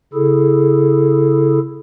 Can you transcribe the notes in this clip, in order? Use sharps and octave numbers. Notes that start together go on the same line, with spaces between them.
C#3 E4 G#4 A4